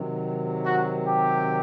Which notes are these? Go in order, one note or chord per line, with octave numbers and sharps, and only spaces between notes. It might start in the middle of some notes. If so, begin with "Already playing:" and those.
Already playing: C3 D#3 F#3
F#4
G4